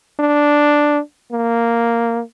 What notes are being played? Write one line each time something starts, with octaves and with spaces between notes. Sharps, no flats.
D4
A#3